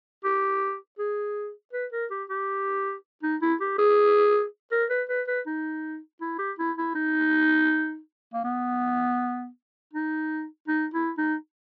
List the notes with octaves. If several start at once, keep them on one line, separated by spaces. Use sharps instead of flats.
G4
G#4
B4
A#4
G4
G4
D#4
E4
G4
G#4
A#4
B4
B4
B4
D#4
E4
G4
E4
E4
D#4
A#3
B3
D#4
D#4
E4
D#4